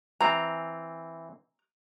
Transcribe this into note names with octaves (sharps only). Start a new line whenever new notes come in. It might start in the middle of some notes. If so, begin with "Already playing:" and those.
E3 C4 A#5